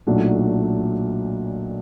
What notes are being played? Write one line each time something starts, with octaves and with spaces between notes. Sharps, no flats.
B1 A#2 F#3 A3 D4